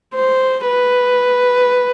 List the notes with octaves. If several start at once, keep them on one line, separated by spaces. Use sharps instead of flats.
C5
B4